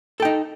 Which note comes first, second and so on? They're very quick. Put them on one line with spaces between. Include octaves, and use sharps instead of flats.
A4 G5 D#4